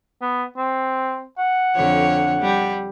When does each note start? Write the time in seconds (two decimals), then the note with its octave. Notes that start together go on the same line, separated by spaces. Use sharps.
0.22 B3
0.57 C4
1.38 F#5
1.76 F2 D3 C#5
2.41 G3